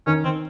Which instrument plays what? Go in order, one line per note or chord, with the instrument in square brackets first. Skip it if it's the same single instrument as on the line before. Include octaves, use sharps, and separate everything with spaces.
[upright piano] D#3 [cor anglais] C#4
[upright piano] D#3 [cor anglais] C4